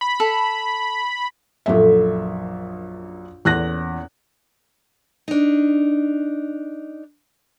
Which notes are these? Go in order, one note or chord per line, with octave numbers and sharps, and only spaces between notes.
B5
A4
A#1 F#2 D3 D#4 E5
E2 A#2 C#4 F#6 A#6
D4 D#4